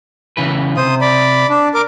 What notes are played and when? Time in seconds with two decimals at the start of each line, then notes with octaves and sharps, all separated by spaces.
0.37 C#3 E3 B4
0.77 C3 C5 D#6
1.01 D5 B5
1.50 D4
1.75 A#4 D6